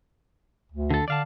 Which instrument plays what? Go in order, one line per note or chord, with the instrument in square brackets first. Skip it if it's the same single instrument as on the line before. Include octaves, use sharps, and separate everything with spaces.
[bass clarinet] D2
[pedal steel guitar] D3 A4
[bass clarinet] D3 [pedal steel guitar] D5 F5 A5